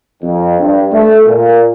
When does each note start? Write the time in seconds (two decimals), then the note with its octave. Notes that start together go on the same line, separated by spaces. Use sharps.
0.21 F2
0.59 G2
0.92 A3
1.25 A#2